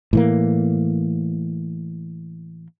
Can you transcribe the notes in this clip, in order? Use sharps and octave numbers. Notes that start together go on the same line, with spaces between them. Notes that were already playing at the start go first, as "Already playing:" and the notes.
A2 E3 A#3